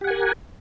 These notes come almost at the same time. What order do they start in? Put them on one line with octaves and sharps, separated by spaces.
G4 F#5 G#5 A#4